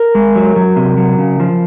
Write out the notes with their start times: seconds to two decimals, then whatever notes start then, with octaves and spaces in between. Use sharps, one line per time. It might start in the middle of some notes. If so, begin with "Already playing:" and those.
Already playing: A#4
0.15 G#3
0.36 F#3
0.56 F#3
0.76 C3
0.98 F#3
1.18 C#3
1.40 F3